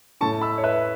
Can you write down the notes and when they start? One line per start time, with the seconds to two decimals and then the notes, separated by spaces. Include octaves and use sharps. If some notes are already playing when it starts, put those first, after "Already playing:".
0.21 A2 A3 C#4 E4 A5 C#6
0.41 B5 E6
0.58 C#5
0.63 B4 E5